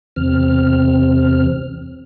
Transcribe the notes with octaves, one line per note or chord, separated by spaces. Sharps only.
E2 C3 C4 F6